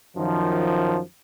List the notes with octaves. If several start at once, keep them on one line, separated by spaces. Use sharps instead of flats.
F#2 D#3 F3